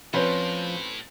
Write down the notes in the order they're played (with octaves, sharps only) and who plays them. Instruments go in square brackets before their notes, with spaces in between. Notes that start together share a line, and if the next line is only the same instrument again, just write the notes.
[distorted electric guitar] A2 [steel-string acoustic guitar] F3 [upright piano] C4 C#4 B4